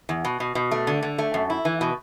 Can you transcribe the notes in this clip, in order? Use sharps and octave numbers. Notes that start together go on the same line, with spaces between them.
E2
B2
B2
B2
A3
D3
D3
A3
F#2
E4
E3
B2